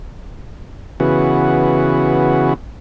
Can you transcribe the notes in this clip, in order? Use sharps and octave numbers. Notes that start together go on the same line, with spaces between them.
C#3 E3 B3 F#4